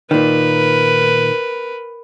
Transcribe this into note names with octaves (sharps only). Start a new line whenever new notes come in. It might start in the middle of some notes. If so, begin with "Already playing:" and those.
A#2 D#3 A#4 B4